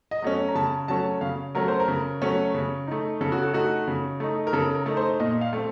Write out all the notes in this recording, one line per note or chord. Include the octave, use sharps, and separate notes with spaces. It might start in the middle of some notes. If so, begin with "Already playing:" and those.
D#5
F#3 A3 C#4
A#5
C#3 A5
F#3 A3 C#4 A5
C#3 F5
F#3 A3 C#4 A#4
C5
A#4
C#3
F#3 A3 C#4
C#3
A3 D#4
C#3 A4
F#4
A4
A3 D#4 F#4
C#3
A3 D#4
A#4
C#3 A4
A#4
A3 D#4
C5
A#2 D#5
F5
A3 C4